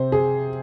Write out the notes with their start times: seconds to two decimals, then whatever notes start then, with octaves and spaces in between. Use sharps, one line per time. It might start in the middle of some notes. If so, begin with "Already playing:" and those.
Already playing: C3 C5
0.12 G#4